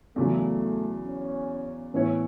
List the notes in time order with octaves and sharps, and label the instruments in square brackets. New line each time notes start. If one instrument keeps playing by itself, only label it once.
[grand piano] E2 C#3 F#3 [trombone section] A3
[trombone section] C#4
[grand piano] A2 E3 B3 E4 C#5 [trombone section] C#4